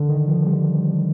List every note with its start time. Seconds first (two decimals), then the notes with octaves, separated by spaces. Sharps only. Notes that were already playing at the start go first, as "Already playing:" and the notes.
Already playing: D3
0.09 D#3
0.27 F3
0.46 G3